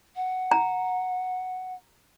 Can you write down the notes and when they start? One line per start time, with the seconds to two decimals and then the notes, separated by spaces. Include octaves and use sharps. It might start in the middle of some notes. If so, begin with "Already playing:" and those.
0.16 F#5
0.51 A#5